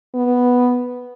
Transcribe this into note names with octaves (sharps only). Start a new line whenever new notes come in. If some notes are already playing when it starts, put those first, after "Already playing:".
B3